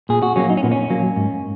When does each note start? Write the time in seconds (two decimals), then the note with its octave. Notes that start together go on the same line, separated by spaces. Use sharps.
0.09 A#2 G#4
0.23 F#4
0.36 F#3 A#3 C#4
0.50 D#4
0.57 C#4
0.63 A#2 B3
0.72 C#4
0.90 F#3 A#3
1.16 G#2